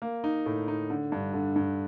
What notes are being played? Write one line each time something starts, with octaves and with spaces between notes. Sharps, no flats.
A#3
D#4
A2
D#4
D3
G2
D3
G2